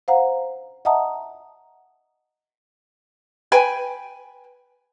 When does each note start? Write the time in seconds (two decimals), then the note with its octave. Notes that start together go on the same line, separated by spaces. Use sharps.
0.08 C5 F5 F#5 A#5
0.85 D#5 E5 F#5 A5 A#5 D#6
3.52 B4 G5 G#5 B5